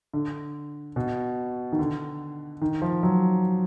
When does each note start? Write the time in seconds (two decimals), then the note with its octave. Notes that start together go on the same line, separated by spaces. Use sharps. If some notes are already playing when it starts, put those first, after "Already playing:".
0.14 D3
0.96 B2
1.72 D#3
1.79 D3
2.62 D#3
2.82 F3
3.03 F#3